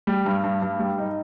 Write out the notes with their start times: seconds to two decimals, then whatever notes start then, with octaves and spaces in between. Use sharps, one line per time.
0.07 G3
0.26 G2
0.44 G2
0.62 G2
0.79 G3
0.98 D#4